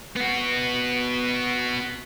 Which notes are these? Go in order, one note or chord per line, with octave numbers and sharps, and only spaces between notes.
B3 F#4